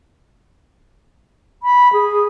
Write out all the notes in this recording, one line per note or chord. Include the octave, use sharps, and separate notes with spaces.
B5
G#4